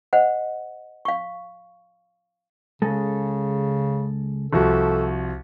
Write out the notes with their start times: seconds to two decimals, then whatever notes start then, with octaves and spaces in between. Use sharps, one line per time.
0.13 C5 D#5 F#5
1.05 F5 C#6
2.82 C#2 C#3 G#3 A4
4.53 C2 F3 F#4 A4